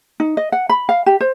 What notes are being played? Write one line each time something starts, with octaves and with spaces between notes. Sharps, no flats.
D#4
D#5
F#5
B5
F5
G4
C5